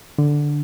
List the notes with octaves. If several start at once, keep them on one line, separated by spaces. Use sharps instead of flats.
D3